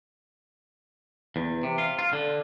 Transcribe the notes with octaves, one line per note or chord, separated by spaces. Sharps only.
E2
C3
F4
F4
D3